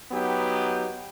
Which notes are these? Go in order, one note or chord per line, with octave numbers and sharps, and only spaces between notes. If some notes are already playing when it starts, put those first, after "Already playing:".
F#3 B3 D#4 G4